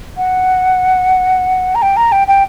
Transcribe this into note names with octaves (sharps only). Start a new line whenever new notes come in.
F#5
A#5
G5
A#5
G5
G5